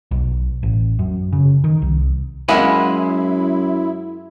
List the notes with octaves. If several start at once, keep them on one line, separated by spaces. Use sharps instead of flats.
B1
A1
F#2
C#3
D#3
C2
F#2 G#3 E4 A#4 F5 F#5 G#5 B5